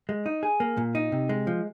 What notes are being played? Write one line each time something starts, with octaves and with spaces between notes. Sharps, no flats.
G#3
D#4
G#4
A#3
A#2
D#4
C3
G#3
F3